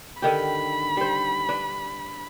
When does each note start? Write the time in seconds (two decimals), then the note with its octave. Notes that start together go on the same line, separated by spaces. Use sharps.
0.22 D3 D#3 G4 B5
0.97 G3 C5
1.49 D4 B4